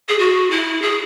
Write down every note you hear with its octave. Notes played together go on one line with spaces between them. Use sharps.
G#4
F#4
E4
G#4